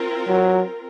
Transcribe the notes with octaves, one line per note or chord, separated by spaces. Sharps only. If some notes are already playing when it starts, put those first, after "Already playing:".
Already playing: C4 F4 A#4
F#3